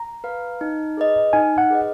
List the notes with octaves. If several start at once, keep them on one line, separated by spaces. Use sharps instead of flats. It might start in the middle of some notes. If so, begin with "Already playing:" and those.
Already playing: A#5
B4 F5
D#4
G#4 B4 D#5
D#4 G#5
F#5
G#4 B4 D#5